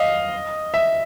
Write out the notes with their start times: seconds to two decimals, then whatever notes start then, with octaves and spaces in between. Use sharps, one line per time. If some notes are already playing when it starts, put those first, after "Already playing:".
Already playing: D#5 F5
0.74 E5